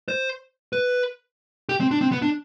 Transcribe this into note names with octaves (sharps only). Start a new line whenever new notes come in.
C5
B4
G4
C4
D4
C4
B3
D4